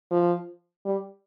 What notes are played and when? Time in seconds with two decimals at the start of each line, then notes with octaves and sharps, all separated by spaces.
0.11 F3
0.85 G3